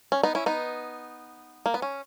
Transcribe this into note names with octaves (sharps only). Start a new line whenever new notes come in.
C#4
B3 D#4
C#4 E4
B3 D#4
A#3
B3
C#4